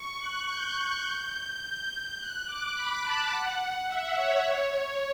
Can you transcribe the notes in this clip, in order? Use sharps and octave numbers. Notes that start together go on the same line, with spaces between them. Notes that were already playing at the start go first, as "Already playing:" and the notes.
Already playing: C#6
F#6
G6
F#6
D6
B5
A5
F#5
E5
C#5
C#5